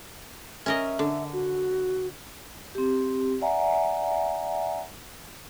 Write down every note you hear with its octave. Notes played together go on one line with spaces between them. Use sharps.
C#4 A#4 D#5 E5
D3
F#4
C4 G4
D5 E5 F#5 G#5 A#5